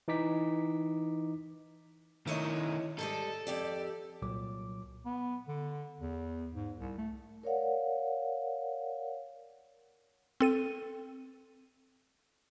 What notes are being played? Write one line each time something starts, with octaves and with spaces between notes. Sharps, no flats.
E3 D#4 D6 B6
D#3 A3 E4 C#5 D#5
G#2 G3 A4 D#5
F2 G4 D5
C2 A#2 F#3 D6
B3
D3
E2
G#2
C2
A3
A#4 C#5 D5 F5 F#5
C4 A4 D#7